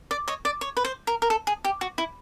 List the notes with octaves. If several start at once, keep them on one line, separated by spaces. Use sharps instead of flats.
D5
C#5 D#5
D5
C#5
B4
C5
A#4
A#4
A4
G#4
G4
F#4
E4